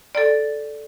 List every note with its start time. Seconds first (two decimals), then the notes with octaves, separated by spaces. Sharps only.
0.15 A4 D5